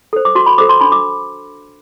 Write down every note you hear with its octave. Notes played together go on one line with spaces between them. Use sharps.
A4 C5
D6
F#4 C6
B5
A4 C5 D6
C6
D4 B5
D6